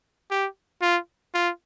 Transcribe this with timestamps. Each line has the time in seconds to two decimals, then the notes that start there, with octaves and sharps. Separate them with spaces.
0.31 G4
0.82 F4
1.34 F4